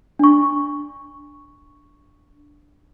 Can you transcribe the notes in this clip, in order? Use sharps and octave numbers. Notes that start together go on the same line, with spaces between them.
D4 C#6